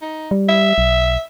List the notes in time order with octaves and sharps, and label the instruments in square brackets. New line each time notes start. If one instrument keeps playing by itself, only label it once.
[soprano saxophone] D#4
[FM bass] G3
[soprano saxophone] E5
[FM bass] B1